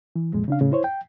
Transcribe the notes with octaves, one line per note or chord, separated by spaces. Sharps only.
E3
C2 F2 A#2 G#3
C#3 D4 F5
A2 C#3
E4 C5 C#5
G5